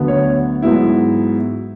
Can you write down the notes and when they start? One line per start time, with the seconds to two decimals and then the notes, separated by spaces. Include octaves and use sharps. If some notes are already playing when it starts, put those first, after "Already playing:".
Already playing: D2 D3 F#3 B3
0.08 C#5
0.62 G#2 F#3 B3 E4